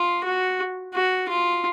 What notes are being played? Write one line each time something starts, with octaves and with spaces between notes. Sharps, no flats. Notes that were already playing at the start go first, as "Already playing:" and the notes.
Already playing: F4
F#4
F#4
F4